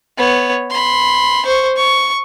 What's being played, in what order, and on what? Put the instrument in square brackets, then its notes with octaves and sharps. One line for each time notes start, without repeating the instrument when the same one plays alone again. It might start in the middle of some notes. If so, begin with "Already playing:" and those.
[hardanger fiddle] B3 C#5
B5 C6
C5 C#6
C#6